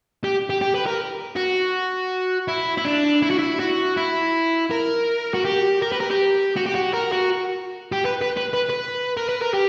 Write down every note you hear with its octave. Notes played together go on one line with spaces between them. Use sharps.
G4
G4
G4
B4
A#4
F#4
E4
E4
D4
E4
F#4
E4
F#4
E4
A#4
F#4
G4
A#4
B4
A#4
G4
F#4
G4
F#4
A#4
F#4
G4
B4
B4
B4
B4
B4
A#4
B4
A#4
G4